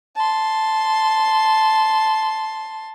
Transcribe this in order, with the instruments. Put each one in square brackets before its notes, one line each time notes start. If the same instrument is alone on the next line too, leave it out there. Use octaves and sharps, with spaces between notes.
[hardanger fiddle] A5 C6